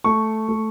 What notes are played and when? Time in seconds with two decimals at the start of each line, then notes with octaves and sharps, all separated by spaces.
0.04 A3 C#6
0.49 A3